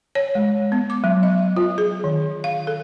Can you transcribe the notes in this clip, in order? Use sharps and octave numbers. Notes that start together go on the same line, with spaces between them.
C#5
G#3
B3
D6
F#3
D#5
F4
G#4
D#3
F5
A4